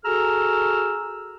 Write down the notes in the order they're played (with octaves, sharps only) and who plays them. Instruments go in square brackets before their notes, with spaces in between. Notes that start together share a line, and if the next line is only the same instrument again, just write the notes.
[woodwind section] F#4 G#4 A4 A#5 E6 F6